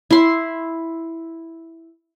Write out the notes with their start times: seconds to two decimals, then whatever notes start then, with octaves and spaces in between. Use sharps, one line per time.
0.11 E4 C6